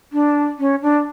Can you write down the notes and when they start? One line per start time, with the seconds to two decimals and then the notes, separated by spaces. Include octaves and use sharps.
0.13 D4
0.59 C#4
0.82 D4